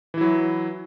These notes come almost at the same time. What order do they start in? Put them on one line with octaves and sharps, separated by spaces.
E3 E4 F#3